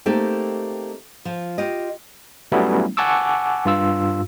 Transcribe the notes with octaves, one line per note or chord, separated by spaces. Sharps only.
A3 A#3 C4 D#4 G4 A4
F3 F4
F4 G4 D#5
F#3 G3 A3 B3 C#4 E4
F#5 G#5 A5 C#6 D6 E6
G2 F4 E6